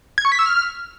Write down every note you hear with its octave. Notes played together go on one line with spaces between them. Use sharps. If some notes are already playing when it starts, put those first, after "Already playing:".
G#6
C#6
B6
E6
F6